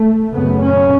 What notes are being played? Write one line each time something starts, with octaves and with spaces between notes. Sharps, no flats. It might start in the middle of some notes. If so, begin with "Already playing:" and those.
Already playing: A3
F#2 C#3 B3
C#4